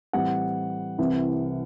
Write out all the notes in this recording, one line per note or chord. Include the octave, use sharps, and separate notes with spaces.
A2 E3 G3 C4 F#5
C2 C3 E3